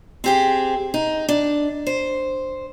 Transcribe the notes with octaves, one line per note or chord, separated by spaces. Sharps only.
C4 G4 G#4
D#4
D4
C5